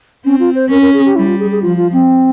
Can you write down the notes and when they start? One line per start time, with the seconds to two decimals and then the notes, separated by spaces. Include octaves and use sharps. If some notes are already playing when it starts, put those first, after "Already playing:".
0.25 C4 C#4
0.40 F4
0.55 C5
0.70 C#4 A#4
0.82 A#4
0.94 G#4
1.05 G4
1.16 G3 E4
1.27 F4
1.39 G#4
1.51 G#4
1.62 F3 F4
1.77 F4
1.93 C4